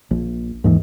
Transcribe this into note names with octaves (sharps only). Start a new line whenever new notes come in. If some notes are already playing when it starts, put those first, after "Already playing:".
A#1
D#2 G#2 E3